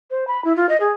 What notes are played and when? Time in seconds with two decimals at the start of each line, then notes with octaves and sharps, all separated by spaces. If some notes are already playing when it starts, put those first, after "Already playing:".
0.11 C5
0.27 B5
0.45 E4
0.56 F4
0.69 D#5
0.80 G#4